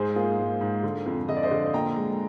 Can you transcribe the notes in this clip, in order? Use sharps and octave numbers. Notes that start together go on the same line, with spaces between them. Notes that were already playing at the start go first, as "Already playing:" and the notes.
Already playing: G#2 G#4 C5
A#3 F4 G#4
G#2
G#2
D3
F2
D3 D#5
D5
C5 D#5
D3
A#2 G5 A#5
G#3